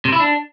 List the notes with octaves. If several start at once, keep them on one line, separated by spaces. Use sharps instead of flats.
C3
E4
D4